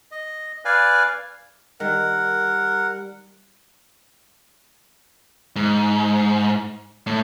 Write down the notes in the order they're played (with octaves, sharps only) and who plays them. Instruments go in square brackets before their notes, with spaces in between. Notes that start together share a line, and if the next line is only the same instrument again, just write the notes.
[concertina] D#5
B4 D5 F5 G#5
[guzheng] D#3 [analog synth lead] G3 [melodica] A#4 F#5
[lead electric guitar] G#2
A2